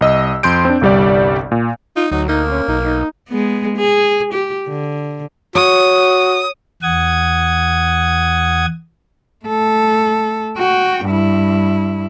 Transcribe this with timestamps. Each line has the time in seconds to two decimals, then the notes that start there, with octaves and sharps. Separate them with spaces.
0.01 C2 D#5 E6
0.43 F2 C6 G6 D7
0.65 C4 D4
0.81 G1 C2 G3 G4 D5
1.52 A#2
1.96 D#4 F4
2.12 D2 F#3 D#4
2.29 A#3 D#4
2.51 C#4
2.68 B1 D#4
2.84 D#4
3.29 G#3 B3
3.77 G#4
4.33 G4
4.68 D3
5.55 F#4 C#5 D#6
6.83 E2 F#5 D#6 G#6
9.45 A3 A4
10.58 F#4 G5
11.05 G2 E4